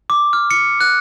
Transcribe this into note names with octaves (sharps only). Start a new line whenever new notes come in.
D6
F6
C#7
F#6